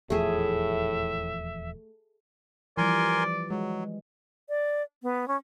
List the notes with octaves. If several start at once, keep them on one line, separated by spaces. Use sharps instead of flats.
D#1 E2 A2 F3 A3 G#4 E5
E3 F3 G3 A#4 D5 G#5 C6
F#3 G#3
D5
B3
C#4